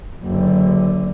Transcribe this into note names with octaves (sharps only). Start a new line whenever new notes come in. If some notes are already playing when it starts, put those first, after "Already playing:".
F#1 D3